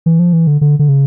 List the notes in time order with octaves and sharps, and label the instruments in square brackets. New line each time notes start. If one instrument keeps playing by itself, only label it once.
[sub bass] E3
F3
E3
D3
D3
D3
C#3